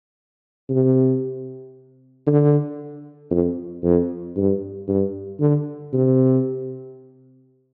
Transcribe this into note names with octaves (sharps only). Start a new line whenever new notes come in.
C3
D3
F2
F2
G2
G2
D3
C3